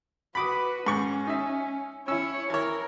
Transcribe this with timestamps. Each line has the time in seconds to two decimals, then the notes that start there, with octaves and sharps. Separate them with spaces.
0.35 F#4 B4 B5 D6 D#6
0.86 G#2 C#4 C#6
1.27 D#4 E5
2.08 C#4 E4 C#5 E6
2.50 E3 A#4 C#5